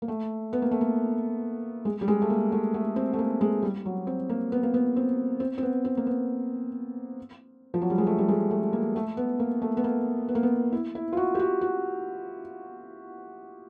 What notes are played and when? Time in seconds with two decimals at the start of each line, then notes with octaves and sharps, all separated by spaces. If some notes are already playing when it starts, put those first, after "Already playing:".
0.02 A#3
0.08 A3
0.53 B3
0.62 A#3
0.71 A3
0.81 A#3
1.85 G#3
2.01 G3
2.08 G#3
2.22 A3
2.30 A#3
2.52 A3
2.74 A3
2.96 C4
3.13 A3
3.19 A#3
3.41 G#3
3.63 G3
3.85 F#3
4.07 C4
4.29 A#3
4.52 B3
4.63 A#3
4.74 B3
4.96 C4
5.40 C4
5.58 C4
5.63 B3
5.85 C4
5.97 A#3
6.07 B3
7.74 F3
7.82 F#3
7.90 G3
7.98 G#3
8.06 A3
8.18 G3
8.28 G#3
8.51 A3
8.73 A#3
8.96 A3
9.17 B3
9.40 A#3
9.62 A3
9.77 B3
9.84 A#3
10.29 B3
10.35 A#3
10.43 B3
10.72 E4
10.95 E4
11.12 F4
11.17 F#4
11.35 G4
11.39 F#4
11.61 F#4